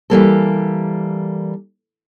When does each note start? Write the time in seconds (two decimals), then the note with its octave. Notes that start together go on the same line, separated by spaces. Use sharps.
0.10 E3 G3 A#3 A4